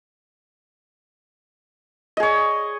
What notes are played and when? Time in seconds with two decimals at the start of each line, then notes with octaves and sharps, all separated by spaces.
2.17 D#5
2.20 G#4
2.23 C#5